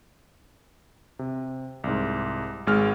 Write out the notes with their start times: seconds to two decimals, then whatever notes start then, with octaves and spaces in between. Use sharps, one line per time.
1.19 C3
1.84 C2 G#2
2.67 G#1 G#3 F6